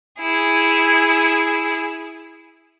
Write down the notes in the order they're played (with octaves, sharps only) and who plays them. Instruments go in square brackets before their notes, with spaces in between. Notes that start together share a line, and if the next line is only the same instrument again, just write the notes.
[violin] E4 G#4